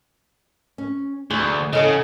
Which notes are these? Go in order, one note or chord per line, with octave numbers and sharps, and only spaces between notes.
C#4
D2 G#4
E2 C#3 A4 D#5